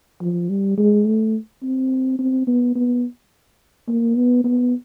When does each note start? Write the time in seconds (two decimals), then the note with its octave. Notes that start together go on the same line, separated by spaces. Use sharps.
0.21 F3
0.50 G3
0.78 G#3
1.07 A3
1.63 C4
2.19 C4
2.47 B3
2.75 B3
3.88 A#3
4.16 B3
4.44 B3